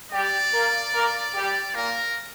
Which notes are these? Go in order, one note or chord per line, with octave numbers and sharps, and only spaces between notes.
G3 G4 D5
A#3 A#4
A#3 A#4
G3 G4
A#2 A#3 A#4